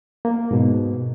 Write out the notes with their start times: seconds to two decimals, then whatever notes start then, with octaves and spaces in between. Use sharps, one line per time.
0.25 A#3
0.51 G#2 B2